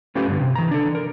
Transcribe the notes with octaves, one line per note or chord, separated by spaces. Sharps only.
A3 C#4 F4 G4 B4
G2 D3
C3
E3 A#5
D4 A4
A#4